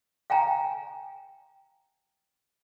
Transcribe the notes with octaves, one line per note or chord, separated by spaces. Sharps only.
F5 G5 G#5 A#5